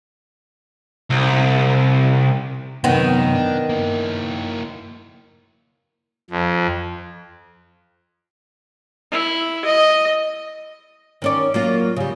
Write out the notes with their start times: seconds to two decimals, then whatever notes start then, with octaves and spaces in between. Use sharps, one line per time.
1.10 C2
2.84 F#2 C3 D#3 B3
3.35 D4
3.69 A#3 E4
6.30 F2
9.11 E4
9.65 D#5
11.22 D#3 C#4 D5
11.54 F#3 A#3 F4
11.97 C#3 G3